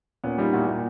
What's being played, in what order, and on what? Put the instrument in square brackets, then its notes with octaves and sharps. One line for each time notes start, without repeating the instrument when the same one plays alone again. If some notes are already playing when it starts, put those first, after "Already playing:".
[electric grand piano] A#2 [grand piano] B3 C#4
[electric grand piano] G3 [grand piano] D#4 F4
[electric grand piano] A#2 [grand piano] E4 F#4
[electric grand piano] A#2